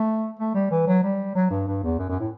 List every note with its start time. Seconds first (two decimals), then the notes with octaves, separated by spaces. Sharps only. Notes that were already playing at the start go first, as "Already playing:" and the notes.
Already playing: A3
0.39 A3
0.55 G3
0.71 E3
0.87 F#3
1.03 G3
1.35 F#3
1.50 G2
1.67 G2
1.83 E2
1.99 F#2
2.09 F#2
2.20 A2